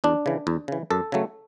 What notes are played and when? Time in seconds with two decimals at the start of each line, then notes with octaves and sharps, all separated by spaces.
0.04 E2 D4
0.26 C#3 E3
0.47 E2
0.68 C#3 E3
0.91 F#2 A4
1.12 C#3 F#3 A3